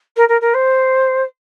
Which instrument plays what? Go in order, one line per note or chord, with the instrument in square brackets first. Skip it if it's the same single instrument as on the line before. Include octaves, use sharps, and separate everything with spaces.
[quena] A#4
A#4
A#4
C5